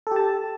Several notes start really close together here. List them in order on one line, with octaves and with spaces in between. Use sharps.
A4 G4 A5